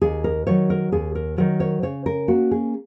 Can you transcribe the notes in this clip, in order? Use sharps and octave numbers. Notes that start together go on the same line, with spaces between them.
D#2 G#4
A#4
D#3 F#3 C#5
A#4
D#2 G#4
A#4
D#3 F#3 A#4
C#5
C#3 C#5
A#4
A#3 C#4 F#4
G#4